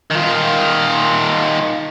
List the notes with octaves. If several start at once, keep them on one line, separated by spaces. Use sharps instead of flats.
D#3 F4